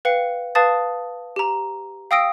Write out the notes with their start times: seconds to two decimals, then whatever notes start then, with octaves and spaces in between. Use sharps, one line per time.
0.05 B4 F5 G5 C#7
0.55 B4 F5 A5 D#6 A6
1.36 G4 A#5
2.11 F5 G5 D#6 E6 A#6 D7